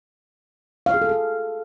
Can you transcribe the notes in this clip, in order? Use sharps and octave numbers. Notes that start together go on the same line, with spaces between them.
F5
G#4
A4
G#4